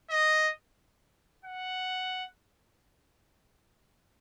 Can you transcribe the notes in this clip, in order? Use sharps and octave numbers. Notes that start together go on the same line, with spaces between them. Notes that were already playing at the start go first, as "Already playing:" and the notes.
D#5
F#5